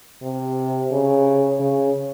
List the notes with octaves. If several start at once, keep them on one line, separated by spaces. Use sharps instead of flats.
C3
C#3
C#3